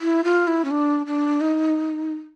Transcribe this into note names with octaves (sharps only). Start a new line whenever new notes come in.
E4
F4
E4
C#4
D4
D4
D#4